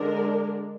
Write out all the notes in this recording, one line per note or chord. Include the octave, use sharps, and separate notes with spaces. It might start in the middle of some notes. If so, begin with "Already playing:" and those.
Already playing: D3 G#3 D4 A#4